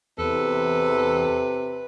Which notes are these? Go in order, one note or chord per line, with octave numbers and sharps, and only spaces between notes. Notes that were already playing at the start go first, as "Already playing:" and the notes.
E2 C3 A4 B4